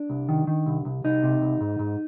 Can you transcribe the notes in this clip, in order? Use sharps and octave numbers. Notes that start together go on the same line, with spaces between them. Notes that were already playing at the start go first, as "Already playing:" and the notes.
Already playing: D4
C2
D#3
D#3
C2
C2
C2 D#4
C3
C2
G#2
G#2